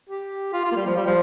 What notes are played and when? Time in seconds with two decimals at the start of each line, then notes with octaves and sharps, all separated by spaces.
0.09 G4
0.53 F4
0.65 F4
0.72 A#3
0.76 G3
0.86 F3
0.97 G3
1.07 F3